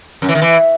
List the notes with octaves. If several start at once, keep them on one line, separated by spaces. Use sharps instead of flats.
F#2
E3
D#3
E3